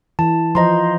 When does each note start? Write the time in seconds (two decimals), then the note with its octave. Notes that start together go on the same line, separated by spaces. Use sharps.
0.19 E3 A5
0.55 F3 C5 D#5 A#5 C6